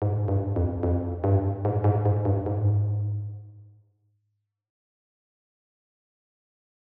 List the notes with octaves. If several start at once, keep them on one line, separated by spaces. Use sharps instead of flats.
G#2
G2
F2
F2
G2
G#2
G#2
G#2
G2
G#2